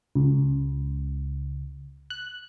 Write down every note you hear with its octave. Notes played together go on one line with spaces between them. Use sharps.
C#2
F#6